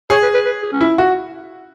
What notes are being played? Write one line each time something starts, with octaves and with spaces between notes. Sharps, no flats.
G#4 C#5
B4
B4
B4
G#4
C#4
E4
F#4